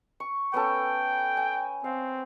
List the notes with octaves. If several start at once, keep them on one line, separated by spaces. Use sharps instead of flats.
C#6
B3 C#4 A4 G5
G#5
C4 F5